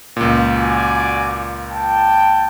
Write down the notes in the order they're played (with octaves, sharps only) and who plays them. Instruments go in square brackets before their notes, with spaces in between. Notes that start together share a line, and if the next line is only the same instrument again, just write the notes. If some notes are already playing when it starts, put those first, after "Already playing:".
[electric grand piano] C#2 A#2
[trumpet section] F#4 D5 G#5
G5 A5